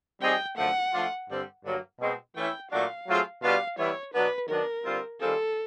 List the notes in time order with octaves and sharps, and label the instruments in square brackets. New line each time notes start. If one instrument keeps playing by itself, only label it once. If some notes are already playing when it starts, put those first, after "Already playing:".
[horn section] G3 C4 D#4 G#4 [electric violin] G5
[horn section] F#2 D3 F3 A3 [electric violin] F#5
[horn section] F3 A3 D4 F4
G2 D3 G3 C4
G2 D3 F#3 A#3
B2 G#3 C4
[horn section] E3 A3 C#4 E4 [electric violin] G5
[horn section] A#2 F#3 A3 D4 F#4 [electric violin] F5
[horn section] F#3 A3 C4 F4 G#4
[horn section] B2 G3 B3 D4 F4 [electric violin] F5
[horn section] E3 G3 B3 E4 [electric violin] C#5
[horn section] B2 F#3 B3 D4 [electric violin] B4
[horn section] D#3 F#3 B3 D4 [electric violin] A#4
[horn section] D3 G3 C4 F4
[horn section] D#3 G3 C4 F4 G#4 [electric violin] A4